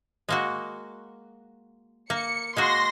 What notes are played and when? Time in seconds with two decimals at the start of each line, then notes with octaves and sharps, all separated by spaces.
0.29 G#3 A#3 F#4
2.10 A#3 C#7
2.57 G#3 A#3 F#4 C6 A#6